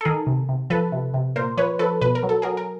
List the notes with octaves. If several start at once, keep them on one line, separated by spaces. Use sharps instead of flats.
A4
D#3 G#4 A#4
C3
C3
F3 A4 B4
C3
C3
A#2 A#4 C5
F3 B4 C#5
F3 A4 B4
B2 B4
A#4
F#3
A4
F#3 G#4 A#4
A#4